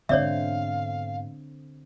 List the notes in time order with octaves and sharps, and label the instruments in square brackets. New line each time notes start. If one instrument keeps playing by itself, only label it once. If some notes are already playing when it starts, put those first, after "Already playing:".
[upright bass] G#2 B2 [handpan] D3 C4 [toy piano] C#5 D5 E5 [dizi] F5